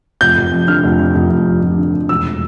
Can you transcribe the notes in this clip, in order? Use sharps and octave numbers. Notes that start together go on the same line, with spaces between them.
F1 G6
F1
F2
D3 F6
F1
F2
F1
F1
F2
F1
D3
F1
E1 E6